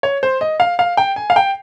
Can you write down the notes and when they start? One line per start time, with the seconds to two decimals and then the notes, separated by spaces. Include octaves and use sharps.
0.03 C#5
0.23 C5
0.41 D#5
0.60 F5
0.79 F5
0.97 G5
1.16 G#5
1.30 F5
1.36 G5